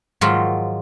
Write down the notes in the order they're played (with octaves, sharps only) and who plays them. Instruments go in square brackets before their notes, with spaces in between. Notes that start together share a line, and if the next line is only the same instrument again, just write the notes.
[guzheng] G#2 D#3 F3 F#3 F4 B5